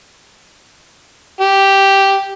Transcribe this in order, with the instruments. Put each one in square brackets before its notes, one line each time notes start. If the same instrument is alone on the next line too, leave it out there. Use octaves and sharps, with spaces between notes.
[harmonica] G4